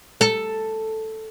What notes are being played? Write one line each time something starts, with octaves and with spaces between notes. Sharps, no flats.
A4